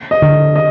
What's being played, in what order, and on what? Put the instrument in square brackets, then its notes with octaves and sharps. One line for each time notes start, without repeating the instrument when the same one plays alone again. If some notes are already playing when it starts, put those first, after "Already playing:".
[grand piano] D#5
[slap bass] D3
[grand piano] D#5